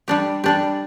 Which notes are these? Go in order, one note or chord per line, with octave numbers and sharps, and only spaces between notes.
G3 D4 G4
G3 D4 G4